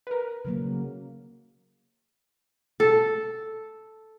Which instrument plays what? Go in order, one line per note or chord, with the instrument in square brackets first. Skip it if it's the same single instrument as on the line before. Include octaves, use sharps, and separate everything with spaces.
[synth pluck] A#4 B4
[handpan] C#3 F#3 A#3
[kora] A4